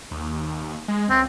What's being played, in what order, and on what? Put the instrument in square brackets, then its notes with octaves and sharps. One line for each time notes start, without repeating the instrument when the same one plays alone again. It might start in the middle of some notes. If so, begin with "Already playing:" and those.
[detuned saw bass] D#2
G#3
[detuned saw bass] C#2 [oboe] C4